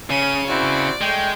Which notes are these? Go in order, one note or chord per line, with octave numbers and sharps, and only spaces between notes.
C#3 C#4 D#7
C4 E4 F#4 D5
G#3 A3 G5